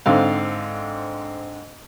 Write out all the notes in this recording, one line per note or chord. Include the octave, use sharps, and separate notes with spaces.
G#2 D3 C4 F5